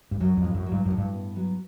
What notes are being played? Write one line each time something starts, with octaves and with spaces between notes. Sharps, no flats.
G2
F#2 F#3
F2
A2
F#2
F#3
G2
F#2 A2
G2
B3
F#3